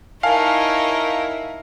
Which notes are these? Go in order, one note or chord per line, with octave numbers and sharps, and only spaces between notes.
D#4 E4 A#4 C#5 F5 G#5 A5